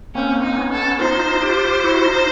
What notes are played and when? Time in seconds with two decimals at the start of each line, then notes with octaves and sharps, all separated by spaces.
0.15 A#3 C4 C#4
0.43 D#4
0.57 B3 C#4
0.71 A4
0.99 D#4 F4 C5
1.41 F4 G4
1.84 E4 F#4
2.05 D#4 F4